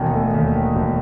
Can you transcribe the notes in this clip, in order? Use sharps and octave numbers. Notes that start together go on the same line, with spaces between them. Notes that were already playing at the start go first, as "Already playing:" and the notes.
Already playing: E1 D#2 D#3 G#5
A3
D#2
D#3
E1